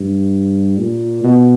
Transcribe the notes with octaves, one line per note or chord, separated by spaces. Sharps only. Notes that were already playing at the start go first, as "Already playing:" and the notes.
Already playing: G2
A#2
B2